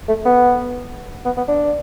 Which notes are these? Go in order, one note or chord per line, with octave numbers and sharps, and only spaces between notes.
A3
B3
B3
B3
D4